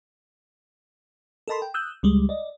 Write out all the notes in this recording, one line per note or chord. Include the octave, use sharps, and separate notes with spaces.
A4 A#4 D#5 A5 B5 C6
G5
D#6 E6 F#6 G6
C#2 G3 G#3
D5 D#5